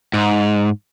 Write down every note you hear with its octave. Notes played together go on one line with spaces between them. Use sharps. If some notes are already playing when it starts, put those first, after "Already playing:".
G#2